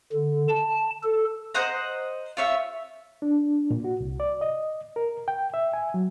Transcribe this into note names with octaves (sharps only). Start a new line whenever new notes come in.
D3
A5
A4
C5 D#5 F#5 A#5
F4 C#5 E5
D4
A#2
F#4
C2
D5
D#5
A#4
G5
E5
G#5
F#3